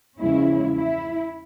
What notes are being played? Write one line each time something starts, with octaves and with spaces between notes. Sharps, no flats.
E2 C#3 F3 G#3 C#4 E4
E4